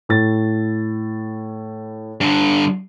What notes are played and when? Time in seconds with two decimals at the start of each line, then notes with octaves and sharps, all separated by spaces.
0.09 A2 A6
2.21 G2 D3